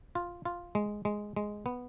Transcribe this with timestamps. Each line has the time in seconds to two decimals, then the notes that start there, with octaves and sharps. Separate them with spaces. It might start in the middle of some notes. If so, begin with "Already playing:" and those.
0.15 F4
0.45 F4
0.75 G#3
1.05 G#3
1.36 G#3
1.66 B3